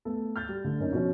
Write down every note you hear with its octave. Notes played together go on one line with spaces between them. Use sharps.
A3 B3 A4
F6 G6 A6
G3
D3 A3
F#2 A#3 C#4 D#4
B2 F3 C#4